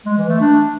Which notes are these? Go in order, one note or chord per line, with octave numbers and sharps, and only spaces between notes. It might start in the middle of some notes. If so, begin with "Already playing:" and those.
G#3
E3
A3
D4